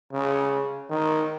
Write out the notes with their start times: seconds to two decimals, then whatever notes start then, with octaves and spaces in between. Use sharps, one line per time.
0.13 C#3
0.90 D#3